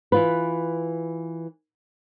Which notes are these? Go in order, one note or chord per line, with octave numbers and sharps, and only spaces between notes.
E3 F4 B4